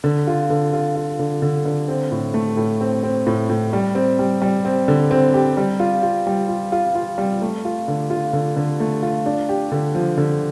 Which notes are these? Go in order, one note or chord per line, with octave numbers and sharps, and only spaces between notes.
D3
F4
D3
F4
F4
D3
D3
D3
C4
A2
A3
A2
C4
C4
A2
A2
G3
C4
G3
G3
C4
D3
C4
G4
G3
F4
F4
G3
F4
F4
F4
G3
A3
F4
D3
F4
D3
D3
A3
F4
D4
G4
D3
F3
D3